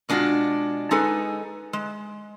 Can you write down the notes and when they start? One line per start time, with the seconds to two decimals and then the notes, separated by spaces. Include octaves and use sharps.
0.09 B2 G#3 D4 D#4 F4 F#4
0.91 G#3 D#4 G#4 A4 B4
1.73 G#3